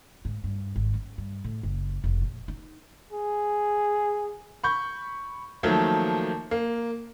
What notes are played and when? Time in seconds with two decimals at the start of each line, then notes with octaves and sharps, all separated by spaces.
0.25 G#2
0.44 G2
0.76 G#1
0.94 C#4
1.18 G2
1.44 A2
1.63 F#1
2.04 F1
2.22 A#1
2.48 D#4
3.12 G#4
4.64 B5 C#6 G6
5.63 D#3 F3 F#3 A3 A#3
6.51 A#3